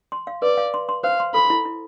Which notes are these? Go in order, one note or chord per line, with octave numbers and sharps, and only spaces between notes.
C6
F5
B4 D5
F5
C6
C6
C5 F5
C6
A4 B5
E4
E4